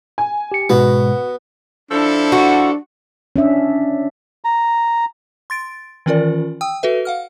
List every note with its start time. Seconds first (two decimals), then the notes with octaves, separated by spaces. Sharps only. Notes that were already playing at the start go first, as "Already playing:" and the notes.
0.18 G#5
0.52 G4 C#7
0.70 G#2 B2 G#3 B3 F#4
1.91 F3 D4 E4 A4
2.32 F#4
3.36 C#4 D4 E5
4.45 A#5
5.50 C6 A6 D7
6.06 D#3 E3 C#4 F4 A#4 D5
6.61 G5 D#6 E6
6.83 F#4 A4 B4 E5
7.05 F5 F#5 F6